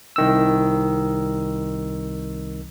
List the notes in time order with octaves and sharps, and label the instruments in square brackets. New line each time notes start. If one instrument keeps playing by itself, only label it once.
[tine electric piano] C2 D#3 E6